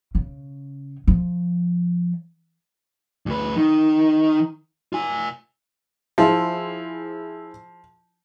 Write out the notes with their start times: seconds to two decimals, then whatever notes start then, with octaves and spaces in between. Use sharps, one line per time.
0.15 C#3
1.07 F3
3.26 D2 B4
3.56 D#3
4.93 F4 G#5
6.18 F3 E4 G#4 C5